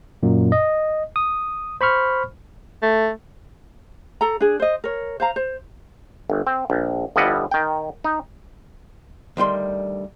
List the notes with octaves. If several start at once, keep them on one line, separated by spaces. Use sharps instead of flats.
F#2 A#2
D#5
D#6
C5 B5 C#6 F6
A3
A4 A#5
D4 G#4
C5 D#5
A#4 C#5
C5 F5 A#5
C5
G1
C4
A#1
G1 F3 G3 E4 D#5 F#5
D#3 G5
D#4
D2 D#3 G3 C6